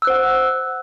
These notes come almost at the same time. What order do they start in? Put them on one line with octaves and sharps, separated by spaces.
E6 F#6 C5 F#5